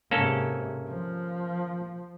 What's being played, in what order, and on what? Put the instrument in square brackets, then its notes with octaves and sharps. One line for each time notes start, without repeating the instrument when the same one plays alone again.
[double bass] G#2 C3 [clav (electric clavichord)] A#3 C#4 A4
[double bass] F3